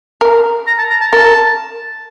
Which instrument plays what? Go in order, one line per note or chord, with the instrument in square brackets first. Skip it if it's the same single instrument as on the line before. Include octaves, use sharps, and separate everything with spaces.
[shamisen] A#4
[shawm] A#5
A5
A#5
A5
[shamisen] A#4 [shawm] A5